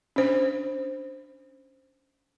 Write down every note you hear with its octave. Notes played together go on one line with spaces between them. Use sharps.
C#4 D4 C5